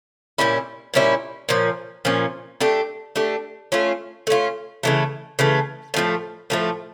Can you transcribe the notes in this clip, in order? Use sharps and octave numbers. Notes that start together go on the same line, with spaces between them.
A#2 G3 C#4 E4
A#2 G3 C#4 E4
A#2 F3 C#4
A#2 F3 C#4
A3 D4 G4
A3 D4 G4
A3 C#4 F4
A3 C#4 F4
C#3 E3 A3
C#3 E3 A3
A2 F3 A3
A2 F3 A3